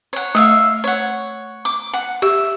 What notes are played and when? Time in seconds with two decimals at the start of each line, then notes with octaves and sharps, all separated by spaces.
0.13 C#5 F#5
0.35 A3 C#5 E5 F5
0.84 C#5 F#5
1.65 D6
1.93 F#5
2.22 G4 E5